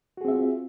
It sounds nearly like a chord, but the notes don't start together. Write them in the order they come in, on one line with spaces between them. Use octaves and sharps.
F#4 G#4 C4 E5 F4